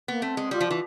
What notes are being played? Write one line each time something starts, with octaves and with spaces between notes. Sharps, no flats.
A#3 B3
A3 C4
G#3
G3 F4
F3
E3 F4